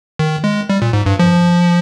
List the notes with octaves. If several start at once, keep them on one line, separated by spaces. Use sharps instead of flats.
D#3
G#3
G3
A#2
G#2
G2
F3